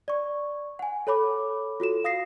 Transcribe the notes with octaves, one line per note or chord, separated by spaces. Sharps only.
D5 C#6
F#5 G#5
A4 C#5 B5 D6
F4 F#4 A4 E7
F5 D#6 A#6 C7